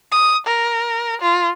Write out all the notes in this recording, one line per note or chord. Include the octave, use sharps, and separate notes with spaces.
D#6
A#4
F4